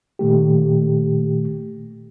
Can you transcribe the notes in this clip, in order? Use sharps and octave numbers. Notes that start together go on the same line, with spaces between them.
A#2 D#3 A3 G4